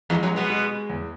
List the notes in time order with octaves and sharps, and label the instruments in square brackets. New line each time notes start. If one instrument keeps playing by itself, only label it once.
[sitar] E2 E3 [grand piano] G#3
[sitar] F#2 F#3
[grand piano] G#3
[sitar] B2 B3
[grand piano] G#3
G#3
E2